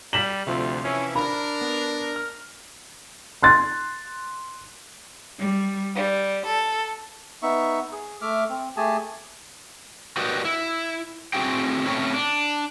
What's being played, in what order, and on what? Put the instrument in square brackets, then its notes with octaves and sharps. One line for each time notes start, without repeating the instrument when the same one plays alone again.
[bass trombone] G3 [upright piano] B6 E7 F#7
[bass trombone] D2 [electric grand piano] C3 F3 [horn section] A3 F4 G4
[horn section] E3 E4 [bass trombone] C#4
[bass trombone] D4 [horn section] A#4 [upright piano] B5
[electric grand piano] B3
F6
[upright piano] C6 F#6 A6
[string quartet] G3
G3
A4
[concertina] B3 D#4 E5 C#6
G#4
A3 E5 D6 F6
C4
A3 G4 G#4 G#5 A5
[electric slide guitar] F#4 G4 A#4 B4 D5 D#5
E4
A3 C4 E4 F#4 G#4 G5
A2 A3 C4 C#4 E4
D4